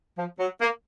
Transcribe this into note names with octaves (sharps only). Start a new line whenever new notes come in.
F3
F#3
A#3